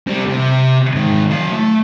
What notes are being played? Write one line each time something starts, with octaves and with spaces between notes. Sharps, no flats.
G3 C4
C3
G#2 D#3
F#3 F5
A3